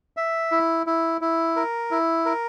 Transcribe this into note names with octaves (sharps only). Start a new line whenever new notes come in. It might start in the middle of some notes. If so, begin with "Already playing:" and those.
E5
E4
E4
E4
A#4
E4
A#4